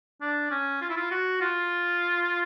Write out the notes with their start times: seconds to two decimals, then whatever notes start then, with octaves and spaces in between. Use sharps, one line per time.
0.21 D4
0.51 C#4
0.81 F4
0.90 E4
0.97 F4
1.11 F#4
1.41 F4